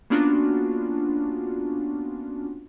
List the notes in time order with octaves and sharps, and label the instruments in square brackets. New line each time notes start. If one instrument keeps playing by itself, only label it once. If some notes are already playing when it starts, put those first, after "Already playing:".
[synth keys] A#3 B3 C#4 D4 F4 F#4